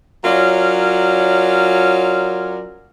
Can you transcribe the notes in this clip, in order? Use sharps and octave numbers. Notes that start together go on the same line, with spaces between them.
F#3 C#4 F4 A#4 D5